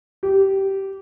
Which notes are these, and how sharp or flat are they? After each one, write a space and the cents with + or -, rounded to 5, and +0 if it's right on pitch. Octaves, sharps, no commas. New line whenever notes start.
G4 -15